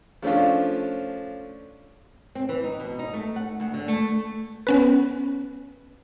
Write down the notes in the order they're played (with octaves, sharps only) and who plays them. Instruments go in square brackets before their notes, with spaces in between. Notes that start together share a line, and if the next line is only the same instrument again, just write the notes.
[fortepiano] F3 A3 C#4 D4 F4
[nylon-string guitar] C4
E3
D#4
B2
D#4
A3
F#5
D2
D3
A3
[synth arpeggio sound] B3 C#4 B4